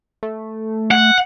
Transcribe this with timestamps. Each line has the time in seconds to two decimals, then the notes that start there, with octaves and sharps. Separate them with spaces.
0.23 A3
0.91 F#5